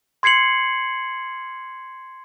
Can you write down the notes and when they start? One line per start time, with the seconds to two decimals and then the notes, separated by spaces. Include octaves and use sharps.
0.23 C6 G#6 C7 C#7 F#7